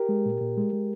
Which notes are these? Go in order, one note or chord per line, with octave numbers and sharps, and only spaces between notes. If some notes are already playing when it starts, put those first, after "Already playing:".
Already playing: G4 A#4
G#3
A#2
A#2
G#3
G#3